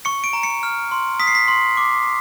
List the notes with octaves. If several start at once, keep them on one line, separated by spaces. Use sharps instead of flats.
C#6 C#7
D7
A#5
C#7
F6
C6
D#6 B6
C7
B6
C6
D6